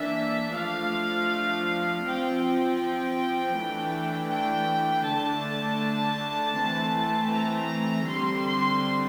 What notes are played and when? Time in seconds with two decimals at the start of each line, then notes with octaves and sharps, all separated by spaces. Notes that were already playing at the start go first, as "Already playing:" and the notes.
Already playing: E3 A#3 D4 E5
0.55 F3 A3 D4 F5
2.06 F3 C4 G5
2.44 G5
3.57 E3 A3 D4
4.32 G5
5.07 D3 A3 D4 A5
6.58 E3 A3 C4
7.34 A#5
8.09 D3 G3 C4 C6
8.47 C6